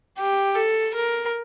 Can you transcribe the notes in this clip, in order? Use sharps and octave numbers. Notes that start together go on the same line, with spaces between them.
G4
A4
A#4